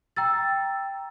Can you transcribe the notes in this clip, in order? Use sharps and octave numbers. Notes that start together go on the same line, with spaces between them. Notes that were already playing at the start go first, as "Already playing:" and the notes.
G5 A#5 E6 A6